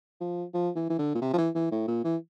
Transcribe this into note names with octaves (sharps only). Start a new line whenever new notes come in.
F3
F3
E3
E3
D3
A#2
C3
F3
E3
E3
A2
A#2
E3